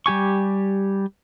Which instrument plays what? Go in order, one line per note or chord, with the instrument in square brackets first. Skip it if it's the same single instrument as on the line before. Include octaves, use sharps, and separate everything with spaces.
[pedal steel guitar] G3 G4 G#5 C#6